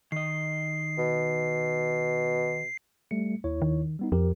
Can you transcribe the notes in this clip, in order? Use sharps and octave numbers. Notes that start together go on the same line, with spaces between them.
D#3 D#5 C7
B2
G3 A3 C#7
D#2 E4 C#5
D#3
G3 B3 D#4
F2 F3 G4 A#4